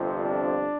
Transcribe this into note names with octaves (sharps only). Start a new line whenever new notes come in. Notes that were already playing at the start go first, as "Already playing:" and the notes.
Already playing: G1 F2 C3 F3
D4